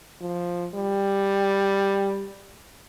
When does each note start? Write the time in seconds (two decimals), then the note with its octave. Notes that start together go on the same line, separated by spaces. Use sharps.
0.21 F3
0.75 G3